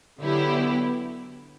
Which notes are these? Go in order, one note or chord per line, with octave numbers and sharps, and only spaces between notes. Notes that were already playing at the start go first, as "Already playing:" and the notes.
D3 F#3 B3 E4 G4